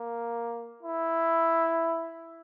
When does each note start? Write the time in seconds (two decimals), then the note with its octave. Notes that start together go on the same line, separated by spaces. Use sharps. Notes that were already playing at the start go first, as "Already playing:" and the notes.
Already playing: A#3
0.83 E4